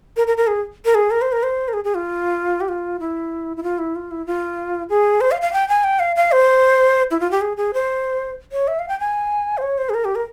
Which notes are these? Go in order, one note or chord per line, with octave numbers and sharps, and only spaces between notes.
A#4
A#4
A#4
G#4
A#4
G#4
A#4
C5
A#4
C5
A#4
G#4
G#4
F4
G4
F4
E4
E4
F4
E4
F4
E4
F4
G#4
C5
F5
F5
G5
G#5
G5
F5
F5
C5
E4
F4
G4
G#4
G#4
C5
C#5
E5
F5
G5
G#5
C5
C#5
C5
G#4
A#4
G4
A#4